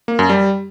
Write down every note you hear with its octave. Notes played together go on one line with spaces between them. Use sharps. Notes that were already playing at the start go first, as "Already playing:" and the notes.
A#3
F#2
G3